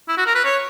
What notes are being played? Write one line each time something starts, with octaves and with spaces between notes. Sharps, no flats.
E4
F#4
A#4
B4
C#5